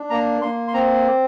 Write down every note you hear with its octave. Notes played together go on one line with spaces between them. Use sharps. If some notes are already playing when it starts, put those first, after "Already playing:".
Already playing: D4
A#3 A#5
A#3 C6
C6
C4 A#5